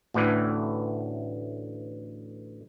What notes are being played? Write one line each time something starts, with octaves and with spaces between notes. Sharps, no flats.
A1 D2 A2 E3